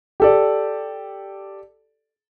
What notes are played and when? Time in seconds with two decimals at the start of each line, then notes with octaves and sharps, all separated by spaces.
0.20 G4 A4 D5